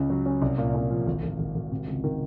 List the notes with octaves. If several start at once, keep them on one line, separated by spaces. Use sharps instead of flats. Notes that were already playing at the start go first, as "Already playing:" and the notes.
Already playing: C#2 C#3 C#4
F#3
C#4
C2
A#2
C2
F3
G#1
G#1
G#1
G#1
C3
C#2
D#3